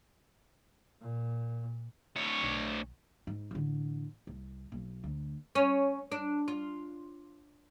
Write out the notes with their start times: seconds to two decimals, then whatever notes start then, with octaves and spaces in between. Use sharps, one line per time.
1.01 A#2
2.16 D2 C#5
2.43 B1
3.27 G#2
3.51 A1 D3
4.27 C2
4.72 B1
5.04 D2
5.55 C#4
6.12 D4
6.48 F4